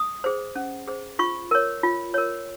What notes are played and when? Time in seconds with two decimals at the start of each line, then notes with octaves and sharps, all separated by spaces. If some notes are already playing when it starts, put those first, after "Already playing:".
Already playing: D#6
0.24 G#4 C5
0.55 C#4
0.87 G#4 C5
1.19 F4 C#6
1.51 A#4 C#5
1.83 F4
2.14 A#4 C#5